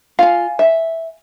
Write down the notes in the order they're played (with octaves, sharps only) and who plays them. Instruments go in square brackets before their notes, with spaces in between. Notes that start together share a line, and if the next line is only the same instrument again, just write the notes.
[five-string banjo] F4 [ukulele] F5 G#5
[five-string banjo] E5